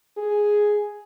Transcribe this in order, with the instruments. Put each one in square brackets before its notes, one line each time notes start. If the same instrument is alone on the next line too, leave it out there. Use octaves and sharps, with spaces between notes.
[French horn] G#4